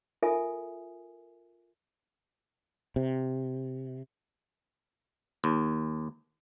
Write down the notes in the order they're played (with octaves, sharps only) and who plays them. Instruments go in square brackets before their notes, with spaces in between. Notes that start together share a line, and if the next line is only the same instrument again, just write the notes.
[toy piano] F4 A4 A#4 E5 G#5 D#6
[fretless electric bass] C3
[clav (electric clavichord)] D#2